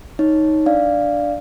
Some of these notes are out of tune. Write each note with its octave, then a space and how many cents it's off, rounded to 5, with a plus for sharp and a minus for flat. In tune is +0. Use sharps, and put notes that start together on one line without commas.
D#4 +10 C#5 +0
D4 +0 D5 +0 F5 +0